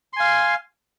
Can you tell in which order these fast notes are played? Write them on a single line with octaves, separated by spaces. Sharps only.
C6 G#5 F5